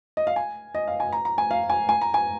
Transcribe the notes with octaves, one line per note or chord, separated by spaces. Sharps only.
D#5
F5
G#5
D#5
F5
G#5
A#5
A#5
G#5
F5
G#5
G#5
A#5
G#5